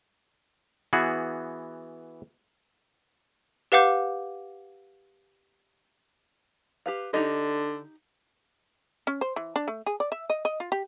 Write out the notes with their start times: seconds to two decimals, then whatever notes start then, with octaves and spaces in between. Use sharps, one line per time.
0.93 E3 B3 F#4 G#4
3.72 G4 B4 F5 F#5 D6 G6
6.86 G4 B4 F5
7.14 D3 D#4 G4 D#5
9.07 C#4
9.21 C5
9.36 E3
9.56 D4
9.68 A3
9.86 G#4
10.00 D5
10.12 E5
10.30 D#5
10.45 D#5
10.60 F4
10.72 G4